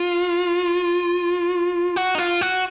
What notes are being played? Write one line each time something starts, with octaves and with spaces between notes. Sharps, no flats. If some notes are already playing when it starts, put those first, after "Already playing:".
Already playing: F4
F#4
D#4
F4
F#4